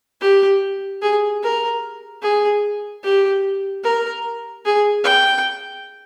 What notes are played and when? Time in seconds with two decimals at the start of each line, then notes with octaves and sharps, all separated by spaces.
0.21 G4
1.02 G#4
1.43 A#4
2.22 G#4
3.03 G4
3.84 A#4
4.65 G#4
5.04 G5